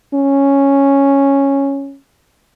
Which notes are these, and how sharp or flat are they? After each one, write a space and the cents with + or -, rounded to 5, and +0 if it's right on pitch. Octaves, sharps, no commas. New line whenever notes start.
C#4 -5